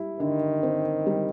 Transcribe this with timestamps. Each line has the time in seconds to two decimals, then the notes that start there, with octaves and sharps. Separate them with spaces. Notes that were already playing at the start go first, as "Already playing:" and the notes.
Already playing: G3 E4
0.20 D3 D#3
0.63 C4
1.07 G3